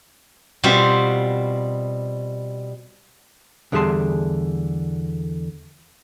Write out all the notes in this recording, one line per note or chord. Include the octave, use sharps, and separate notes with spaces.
B2 G3 C4 F4 F#4
E2 D3 G3 G#4 A5 C6